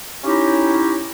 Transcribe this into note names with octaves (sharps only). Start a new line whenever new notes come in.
C#4 D#4 E4 G4